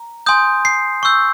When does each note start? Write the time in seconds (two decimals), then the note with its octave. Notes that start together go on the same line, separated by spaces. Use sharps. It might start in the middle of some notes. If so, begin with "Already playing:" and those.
Already playing: A#5
0.26 G#5 C6 D#6 G6
0.65 C7
1.03 C#6 E6 G6